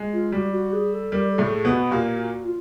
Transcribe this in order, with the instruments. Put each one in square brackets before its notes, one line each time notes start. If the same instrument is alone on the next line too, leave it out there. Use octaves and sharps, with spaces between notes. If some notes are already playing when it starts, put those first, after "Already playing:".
Already playing: [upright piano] G#3
[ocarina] F4
[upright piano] G3 [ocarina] F#4
[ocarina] F#4
G#4
A4
[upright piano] G3 [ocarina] A#4
[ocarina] A4
[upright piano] A2 A3
[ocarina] G#4
[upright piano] B2 B3
[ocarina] F#4
[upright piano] A#2 A#3 [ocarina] G4
[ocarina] F#4
F4